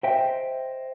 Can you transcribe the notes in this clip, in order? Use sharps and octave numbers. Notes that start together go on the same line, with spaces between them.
C5 D#5 E5 G5